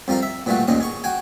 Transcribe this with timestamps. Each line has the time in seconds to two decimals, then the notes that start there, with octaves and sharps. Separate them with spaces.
0.08 F2 G3 F4 A#4 F5
0.22 E5
0.46 A#2 E3 G3 A3 F4 F#4
0.68 A1 D#2 A#2 D#5 D#6
0.80 G#4 C#6
1.04 F#4 G5 G#5